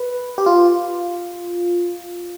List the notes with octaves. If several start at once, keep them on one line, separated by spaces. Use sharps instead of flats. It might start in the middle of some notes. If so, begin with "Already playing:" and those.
Already playing: B4
G4
F4